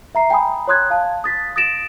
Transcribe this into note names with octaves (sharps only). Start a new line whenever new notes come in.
E5 A#5 C7
G5 G#5 A#5 B5 D#6
C#5 A#5 C6 D#6 F#6 G#6
F5 A5
D#6 A6 B6
D#6 A6 A#6 D7 E7